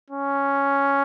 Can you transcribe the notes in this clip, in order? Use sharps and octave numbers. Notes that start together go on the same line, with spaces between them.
C#4